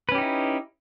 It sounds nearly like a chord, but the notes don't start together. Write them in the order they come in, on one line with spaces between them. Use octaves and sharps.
B4 C#4 G4 D#4 E4